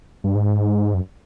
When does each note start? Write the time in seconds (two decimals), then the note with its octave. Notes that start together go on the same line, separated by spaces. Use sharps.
0.24 G2
0.35 G#2
0.94 F#2